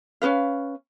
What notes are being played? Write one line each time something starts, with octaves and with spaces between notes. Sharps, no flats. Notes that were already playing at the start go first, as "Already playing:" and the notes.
C#4 D#4 B4 F5